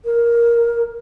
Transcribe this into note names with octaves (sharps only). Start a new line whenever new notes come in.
A#4